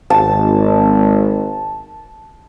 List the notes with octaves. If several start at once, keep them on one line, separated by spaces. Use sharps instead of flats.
G#1 A5